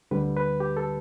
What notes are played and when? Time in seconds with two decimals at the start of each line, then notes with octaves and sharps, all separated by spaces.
0.11 D2 D3 G3 B4
0.37 B4
0.60 G4
0.77 A4